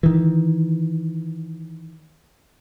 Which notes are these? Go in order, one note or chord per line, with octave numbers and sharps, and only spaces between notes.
D#3 E3